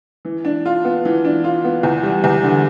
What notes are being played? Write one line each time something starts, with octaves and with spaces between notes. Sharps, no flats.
E3
D4
F4
B3
E3
D4
F4
B3
E2
G3
E2
D3